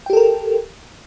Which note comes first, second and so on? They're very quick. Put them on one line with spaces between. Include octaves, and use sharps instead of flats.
G5 G4 A4 A#4